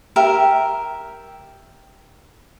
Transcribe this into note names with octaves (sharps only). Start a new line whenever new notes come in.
G4 A#4 E5